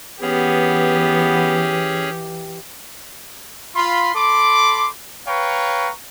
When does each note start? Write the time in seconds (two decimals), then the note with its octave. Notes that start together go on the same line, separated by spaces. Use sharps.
0.22 E3 B3 C#4 G4 G#4 C#5
3.75 F4 B5 C6
4.15 A4 B5 C6 D6
5.27 B4 C#5 F5 G5 A#5 C#6